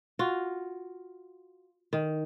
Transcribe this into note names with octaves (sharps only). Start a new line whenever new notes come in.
F4 F#4
D#3